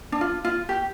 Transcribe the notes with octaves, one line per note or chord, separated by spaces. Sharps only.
D4
F4
F4
G4